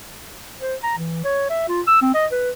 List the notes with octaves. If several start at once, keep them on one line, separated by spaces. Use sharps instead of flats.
C5
A#5
E3
C#5
E5
F4
E6
C4
D#5
B4